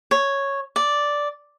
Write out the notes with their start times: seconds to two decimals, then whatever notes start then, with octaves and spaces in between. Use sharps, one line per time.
0.11 C#5
0.76 D5